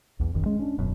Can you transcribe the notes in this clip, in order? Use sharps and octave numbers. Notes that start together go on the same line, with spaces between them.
B1 E2
D1 G#1 F#2 D#3
G#3 C#4
C#4 D4
D#1 F#2 B2